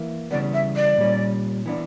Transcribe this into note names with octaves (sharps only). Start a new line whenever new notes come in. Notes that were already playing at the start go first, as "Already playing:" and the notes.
Already playing: E3 A#3 E4
C#3 E3 G3 B3 D5
E5
D5
A#2 G3 C#4
E3 B3 D4